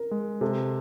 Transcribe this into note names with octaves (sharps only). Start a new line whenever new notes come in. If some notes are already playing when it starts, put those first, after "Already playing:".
Already playing: A#4
G#3
C3 A4